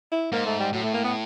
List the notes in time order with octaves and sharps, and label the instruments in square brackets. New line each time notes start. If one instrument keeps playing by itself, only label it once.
[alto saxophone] E4
[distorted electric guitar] G#2 [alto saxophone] A#3
[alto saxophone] A3
G3
[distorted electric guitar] A2 [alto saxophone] F#3
[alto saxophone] A3
A#3
B3